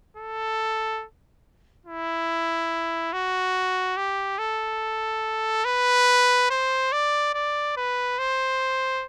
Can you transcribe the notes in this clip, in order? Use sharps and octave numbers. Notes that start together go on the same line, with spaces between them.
A4
E4
F#4
G4
A4
B4
C5
D5
D5
B4
C5